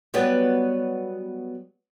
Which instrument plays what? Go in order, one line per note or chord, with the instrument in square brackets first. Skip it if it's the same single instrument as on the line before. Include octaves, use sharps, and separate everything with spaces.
[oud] F#3 G3 B3